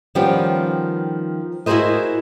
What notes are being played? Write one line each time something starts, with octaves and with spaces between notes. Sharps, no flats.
D#3 F3 G3 B3 C#4 G4
E4 F#4 G#4 A#4 C5 D#5